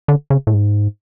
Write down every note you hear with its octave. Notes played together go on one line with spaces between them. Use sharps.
D3
C#3
A2
G#2